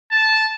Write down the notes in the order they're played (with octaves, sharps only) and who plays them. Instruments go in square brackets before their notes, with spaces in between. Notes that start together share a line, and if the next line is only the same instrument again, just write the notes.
[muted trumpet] A5